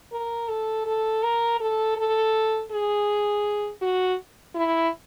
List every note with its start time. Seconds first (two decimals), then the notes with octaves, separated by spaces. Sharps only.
0.12 A#4
0.49 A4
0.86 A4
1.23 A#4
1.60 A4
1.97 A4
2.72 G#4
3.82 F#4
4.55 E4